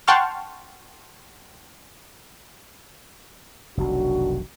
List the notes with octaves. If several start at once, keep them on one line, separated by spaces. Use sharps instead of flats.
F#5 G5 A5 C6 C#6 F6
F1 B1 D#3 D4 F#4